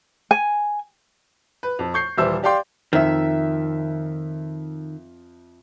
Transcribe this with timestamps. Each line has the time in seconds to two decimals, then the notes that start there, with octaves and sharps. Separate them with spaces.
0.31 G#5
1.63 B4
1.79 F2
1.94 C#6 G6 C7
2.18 D#1 E3 G3 C5 E5 E6
2.43 G4 D5 F5 G5 C6
2.93 F2 D#3 E5